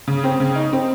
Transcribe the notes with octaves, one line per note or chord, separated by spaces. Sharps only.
C#3
C4
C#3
D#4
C4